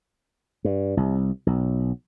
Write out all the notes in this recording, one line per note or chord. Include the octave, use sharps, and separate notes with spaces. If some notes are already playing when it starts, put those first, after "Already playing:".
G2
C2
B1